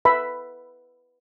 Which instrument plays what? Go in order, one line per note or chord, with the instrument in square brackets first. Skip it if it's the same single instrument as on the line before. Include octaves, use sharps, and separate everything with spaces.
[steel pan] B4 E5 B5